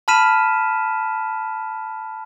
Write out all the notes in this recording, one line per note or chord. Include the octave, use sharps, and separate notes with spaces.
A5 B5 F6 B6 D#7 E7